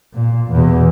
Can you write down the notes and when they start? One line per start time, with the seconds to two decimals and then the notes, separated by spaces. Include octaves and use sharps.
0.14 A#2
0.52 E2 B2